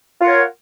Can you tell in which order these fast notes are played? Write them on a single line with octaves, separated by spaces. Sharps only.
F4 F#5 A#4 C#5